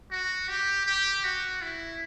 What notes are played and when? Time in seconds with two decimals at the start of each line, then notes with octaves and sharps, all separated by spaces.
0.11 F#4
0.48 G4
0.86 G4
1.24 F#4
1.62 E4